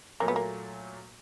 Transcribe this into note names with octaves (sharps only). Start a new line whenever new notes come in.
A#2 F#3 A3 A#3
B3
A#3